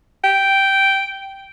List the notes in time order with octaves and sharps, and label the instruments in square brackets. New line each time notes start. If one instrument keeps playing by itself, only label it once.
[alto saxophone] G5